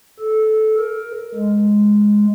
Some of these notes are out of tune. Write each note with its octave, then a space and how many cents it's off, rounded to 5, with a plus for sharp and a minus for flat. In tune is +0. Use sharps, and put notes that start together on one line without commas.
A4 -15
A#4 +10
G#3 +0